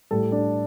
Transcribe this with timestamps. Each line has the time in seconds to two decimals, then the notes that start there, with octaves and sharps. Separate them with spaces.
0.11 A2 G3 A4
0.32 D4